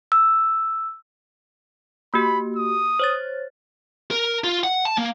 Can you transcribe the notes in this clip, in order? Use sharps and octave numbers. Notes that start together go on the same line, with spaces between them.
E6
A#3 F#4 G4 B5
D#6
C5 C#5 A6
A#4
F4
F#5
A5
A#3